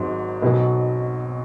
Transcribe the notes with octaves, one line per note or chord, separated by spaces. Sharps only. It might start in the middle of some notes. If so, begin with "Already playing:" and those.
Already playing: G#1 G#2 F#3
B1 B2 F#3